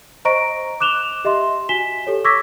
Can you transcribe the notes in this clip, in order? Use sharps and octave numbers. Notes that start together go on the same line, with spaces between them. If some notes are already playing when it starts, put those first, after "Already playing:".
C5 D#5 A#5 C#6 A#6 D7
D6 F#6 E7 F7 G7
G4 D#5 E5 C6
F#4 G#5 B6 E7 G7
G4 A4 C#5
C#6 D6 E6 G#6 A#6 B6